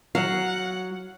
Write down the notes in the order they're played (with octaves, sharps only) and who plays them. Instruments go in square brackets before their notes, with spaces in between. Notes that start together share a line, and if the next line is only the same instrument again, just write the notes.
[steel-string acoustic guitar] F#3 [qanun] F5 [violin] F#5